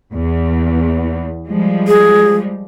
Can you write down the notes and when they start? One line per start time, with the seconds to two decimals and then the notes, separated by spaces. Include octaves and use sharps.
0.13 E2
1.47 F3 G3 G#3
1.88 G#4